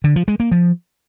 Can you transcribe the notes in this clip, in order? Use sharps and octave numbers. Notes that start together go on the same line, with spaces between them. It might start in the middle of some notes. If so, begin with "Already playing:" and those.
D3
F3
G#3
A#3
F3